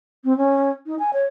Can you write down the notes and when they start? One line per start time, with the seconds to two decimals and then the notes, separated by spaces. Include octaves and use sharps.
0.24 C4
0.38 C#4
0.86 D#4
0.99 G#5
1.13 C#5